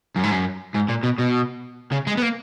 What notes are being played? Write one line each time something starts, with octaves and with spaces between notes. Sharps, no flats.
F#2
G#2
F#2
G#2
A#2
B2
B2
C#3
G#3
B3
A#3